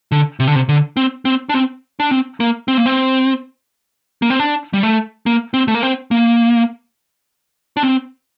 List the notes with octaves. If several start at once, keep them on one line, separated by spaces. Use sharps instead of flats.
D3
C3
D3
C3
D3
C4
C4
D4
C4
D4
C4
A#3
C4
A#3
C4
A#3
C4
D4
G3
A3
A#3
C4
A3
A#3
C4
A#3
D4
C4